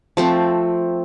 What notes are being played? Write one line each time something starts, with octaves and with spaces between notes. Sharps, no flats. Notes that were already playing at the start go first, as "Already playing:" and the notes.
F3 A3 C4